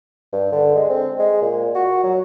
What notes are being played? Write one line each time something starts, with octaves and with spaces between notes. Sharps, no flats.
G2
D3
G#3
C4
G#3
A#2
F#4
F#3